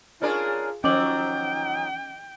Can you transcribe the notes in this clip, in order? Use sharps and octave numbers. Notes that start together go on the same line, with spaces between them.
C#4 D4 F4 G#4 A#4
D#3 F3 F#3 C#4 D#5 G5 D6 F#7